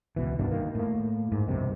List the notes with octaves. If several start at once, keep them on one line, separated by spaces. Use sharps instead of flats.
C#2 B2 E3
G2 B2 D#3 D4
D#3 A#3
A2 A#3
G#2
B1 G2 C3 D#3